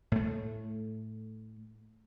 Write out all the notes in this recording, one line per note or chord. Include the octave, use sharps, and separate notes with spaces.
A2 A3